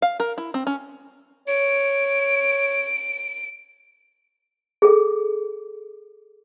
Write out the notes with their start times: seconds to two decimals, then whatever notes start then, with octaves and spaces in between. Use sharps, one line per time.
0.02 F5
0.20 A#4
0.38 E4
0.54 C4
0.67 C#4
1.48 C#5 D7
4.82 G#4 A4